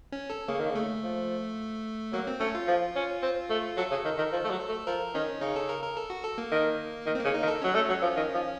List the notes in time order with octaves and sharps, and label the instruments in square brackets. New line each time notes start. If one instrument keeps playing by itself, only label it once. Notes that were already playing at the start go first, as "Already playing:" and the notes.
[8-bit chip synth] C#4
A4
[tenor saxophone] C#3 [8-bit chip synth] A#3
[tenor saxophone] D#3
[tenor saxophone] C#3 [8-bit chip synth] A3
[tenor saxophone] F3
[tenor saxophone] F#3 [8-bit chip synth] A#3
[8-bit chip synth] C4
[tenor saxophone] A3 [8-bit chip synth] C#4
[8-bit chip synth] F4
[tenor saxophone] F3
C#4
C4
A3
[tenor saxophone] F#3 [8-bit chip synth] A4
[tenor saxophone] C#3
D#3
D#3
F3
A3
F#3
A3
[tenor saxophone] F3 [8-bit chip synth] A#4
[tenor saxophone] D#3 [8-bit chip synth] C#4
[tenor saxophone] C#3 [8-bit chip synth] D#4
[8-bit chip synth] A4
A#4
A#4
A4
F#4
A4
A#3
[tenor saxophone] D#3
D#3
[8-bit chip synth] C4
[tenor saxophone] C#3 [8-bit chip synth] A#3
[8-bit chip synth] D#4
[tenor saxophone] D#3
[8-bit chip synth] A4
[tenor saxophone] F#3 [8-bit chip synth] C#4
[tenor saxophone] A3
F#3
F3
D#3
F3